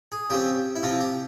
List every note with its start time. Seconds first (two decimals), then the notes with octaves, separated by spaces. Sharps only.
0.12 G#4
0.30 C#3 F3 C4 G4
0.76 E4
0.83 C3 F3 C4 F4
1.00 G4